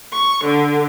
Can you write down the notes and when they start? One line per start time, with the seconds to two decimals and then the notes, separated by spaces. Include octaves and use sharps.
0.13 C#6
0.44 D3